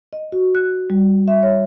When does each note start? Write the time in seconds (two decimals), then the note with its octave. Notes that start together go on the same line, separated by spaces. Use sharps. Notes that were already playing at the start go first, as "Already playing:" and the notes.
0.13 D#5
0.32 F#4
0.55 F#6
0.90 G3
1.28 E5
1.43 C#5